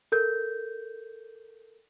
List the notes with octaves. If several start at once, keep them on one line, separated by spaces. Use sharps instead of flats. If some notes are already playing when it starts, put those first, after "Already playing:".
A4 A#4 G6